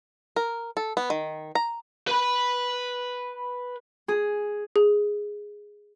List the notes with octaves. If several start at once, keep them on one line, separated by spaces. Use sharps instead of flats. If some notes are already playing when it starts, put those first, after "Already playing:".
A#4
A4
B3
D#3
A#5
B4 B5
G#4
G#4